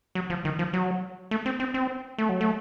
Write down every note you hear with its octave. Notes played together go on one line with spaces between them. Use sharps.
F#3
F3
D#3
F3
F#3
A3
C4
C4
C4
A3
F#3
A3